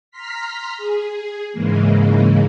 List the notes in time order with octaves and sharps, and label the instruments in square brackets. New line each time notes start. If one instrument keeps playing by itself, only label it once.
[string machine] A#5 C6 F6 B6
G#4
G#2 C#3 E3 G#3 A#3